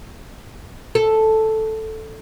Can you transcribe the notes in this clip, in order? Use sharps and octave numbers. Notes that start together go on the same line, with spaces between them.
A4